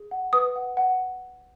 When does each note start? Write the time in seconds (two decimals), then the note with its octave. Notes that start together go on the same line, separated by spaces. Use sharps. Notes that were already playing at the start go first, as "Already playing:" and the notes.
Already playing: G#4
0.11 F#5
0.33 B4 D#6
0.56 F#5
0.77 F#5